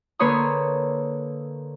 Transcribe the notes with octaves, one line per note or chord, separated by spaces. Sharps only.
D3 A#3 B4 C#5 C6 D#6